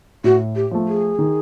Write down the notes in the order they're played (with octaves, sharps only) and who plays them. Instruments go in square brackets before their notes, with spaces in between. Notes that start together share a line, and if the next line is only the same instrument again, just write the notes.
[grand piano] A2 [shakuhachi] F#4
[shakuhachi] G4
[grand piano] F3 A3
[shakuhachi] G#4
[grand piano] D#3